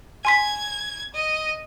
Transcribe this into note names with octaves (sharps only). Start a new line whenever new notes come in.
G#5 C6 G#6 B6
D#5